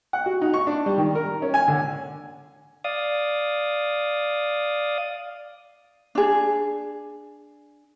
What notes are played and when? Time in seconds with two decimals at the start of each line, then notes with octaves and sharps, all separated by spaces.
0.13 F#5
0.26 F#4
0.41 D#4
0.54 C#6
0.67 D4
0.86 G3
0.98 D#3
1.15 A#4
1.42 C#4
1.54 G#5
1.68 D3
2.84 D5 F5 D#6
6.15 D4 G#4